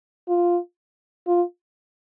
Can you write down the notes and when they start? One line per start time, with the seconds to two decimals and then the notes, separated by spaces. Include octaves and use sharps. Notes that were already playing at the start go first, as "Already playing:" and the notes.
0.28 F4
1.27 F4